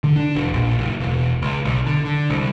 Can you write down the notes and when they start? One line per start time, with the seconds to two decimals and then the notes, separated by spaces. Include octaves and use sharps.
0.04 D3
0.16 D4
0.35 E1
0.53 A#1
0.78 F#1
1.00 E1
1.42 C#2
1.65 B1
1.86 D3
2.05 D3
2.30 C2